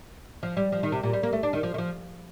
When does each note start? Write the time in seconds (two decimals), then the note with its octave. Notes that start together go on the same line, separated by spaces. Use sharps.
0.43 F3
0.57 G3
0.72 F3
0.83 D#3
0.92 C3
1.03 A#2
1.13 G3
1.23 A#3
1.33 A3
1.43 D4
1.53 D#3
1.63 F3
1.74 D#3
1.78 F3